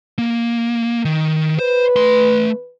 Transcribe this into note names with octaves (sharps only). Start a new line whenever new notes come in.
A#3
D#3
B4 C5
A3 C6